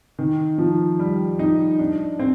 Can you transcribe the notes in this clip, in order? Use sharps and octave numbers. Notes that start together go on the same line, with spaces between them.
D#3
F3
G3
D#4
D4
C4